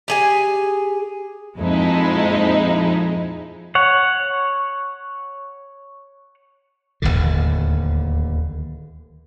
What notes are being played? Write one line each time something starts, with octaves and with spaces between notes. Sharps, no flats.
G4 G#4 G#5
F2 A#2 F3 G#3 D#4 E4
C#5 F#5
D1 A1 D#2 D3